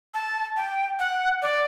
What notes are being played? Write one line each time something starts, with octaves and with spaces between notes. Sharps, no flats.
A5
G5
F#5
D5